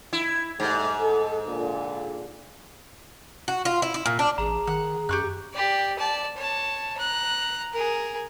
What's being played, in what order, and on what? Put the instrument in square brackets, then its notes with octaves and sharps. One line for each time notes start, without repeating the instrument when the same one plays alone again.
[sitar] E4
[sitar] G#2 [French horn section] G3 A3
[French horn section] A4
A#2 D3
[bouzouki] F#4
F4
E4
E4
A#2
D4
[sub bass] A1 [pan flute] G#4 [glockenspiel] A#5
[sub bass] D#3 [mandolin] F#5
[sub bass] F#2 [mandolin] G4 C#6 F#6
[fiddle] G4 D5
D5 A5
C#5 A5
A#5 F#6
G#4 A#4